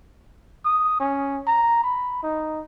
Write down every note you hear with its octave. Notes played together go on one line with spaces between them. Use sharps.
D#6
C#4
A#5
B5
D#4